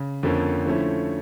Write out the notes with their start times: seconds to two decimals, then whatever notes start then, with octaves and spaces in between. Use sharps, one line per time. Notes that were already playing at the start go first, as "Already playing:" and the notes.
Already playing: C#3
0.23 F2 D3 F3 A#3 C#4
0.65 D3 F3 A3 C#4 E4